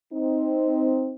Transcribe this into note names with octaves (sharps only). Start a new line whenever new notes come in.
C4 D#4